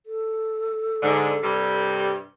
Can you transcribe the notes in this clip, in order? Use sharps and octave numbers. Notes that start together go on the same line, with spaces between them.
A4
G#2 D3
G2 C3 G3